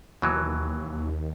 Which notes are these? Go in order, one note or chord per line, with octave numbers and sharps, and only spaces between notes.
D#2 B2 E3 F#3